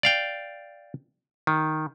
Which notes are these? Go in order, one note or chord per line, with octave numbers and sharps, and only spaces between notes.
D5 F5 G5
D#3